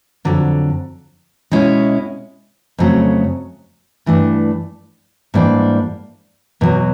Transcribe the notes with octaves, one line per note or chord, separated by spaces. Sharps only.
F2 D3 F#3
B2 G#3 C#4 E4
F2 C#3 F#3 A3 C#4
G2 E3 A3 D4
G#2 E3 G3 A#3 D4
E2 B2 F#3